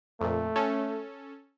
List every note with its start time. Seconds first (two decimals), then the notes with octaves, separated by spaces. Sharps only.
0.21 F2 A#2 A3
0.56 C#4 A4